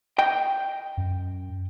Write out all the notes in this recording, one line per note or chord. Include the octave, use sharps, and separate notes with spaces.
D#5 G5
F#2